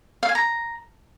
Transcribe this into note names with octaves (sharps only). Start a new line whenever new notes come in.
F5
G#5
A#5